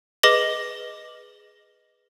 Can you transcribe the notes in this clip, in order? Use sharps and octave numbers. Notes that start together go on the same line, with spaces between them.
G#4 B4 D#5 D6 A#6 F#7